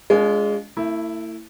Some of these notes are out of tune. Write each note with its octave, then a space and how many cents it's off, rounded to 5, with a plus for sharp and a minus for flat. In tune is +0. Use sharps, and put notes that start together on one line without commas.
G#3 +0 D4 -45 F4 +0
A3 +40 E4 +0